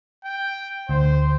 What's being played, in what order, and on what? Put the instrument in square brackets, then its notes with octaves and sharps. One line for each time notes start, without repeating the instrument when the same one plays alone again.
[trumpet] G5
[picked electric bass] D2 [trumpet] C5